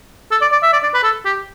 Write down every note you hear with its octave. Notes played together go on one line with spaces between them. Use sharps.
A4
D5
D5
E5
D5
D5
B4
A4
G4